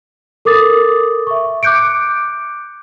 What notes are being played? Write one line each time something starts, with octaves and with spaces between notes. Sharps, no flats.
A4 A#4 D6 D#6 A6
E5 C#6
D6 F#6 G6 C#7 D7